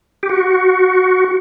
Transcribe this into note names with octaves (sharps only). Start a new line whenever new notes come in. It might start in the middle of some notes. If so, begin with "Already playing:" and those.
G4
F#4